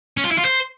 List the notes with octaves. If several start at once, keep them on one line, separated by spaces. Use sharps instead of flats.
C#4
F4
E4
F4
C5